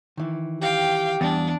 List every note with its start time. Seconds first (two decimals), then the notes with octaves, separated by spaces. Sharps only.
0.17 D#3 E3
0.61 G4 F5 G5
1.21 E2 G3 D4